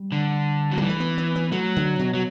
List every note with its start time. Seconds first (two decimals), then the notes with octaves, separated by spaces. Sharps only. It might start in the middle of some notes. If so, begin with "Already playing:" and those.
Already playing: G3
0.12 D3
0.71 F#3
0.78 E3 G3
0.89 A3
1.00 B3
1.18 B3
1.36 B3
1.52 F#3 A3
1.76 D3
1.99 B2
2.14 F#3